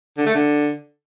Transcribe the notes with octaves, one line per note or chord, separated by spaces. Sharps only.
D3
A3
D3